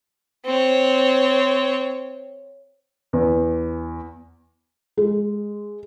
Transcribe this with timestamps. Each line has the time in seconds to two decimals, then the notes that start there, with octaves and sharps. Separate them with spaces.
0.45 C4 C#5
3.13 E2
4.97 G#3